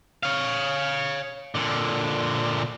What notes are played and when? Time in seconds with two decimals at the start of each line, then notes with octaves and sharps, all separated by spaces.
0.23 C#5 F5
1.55 A#2 D3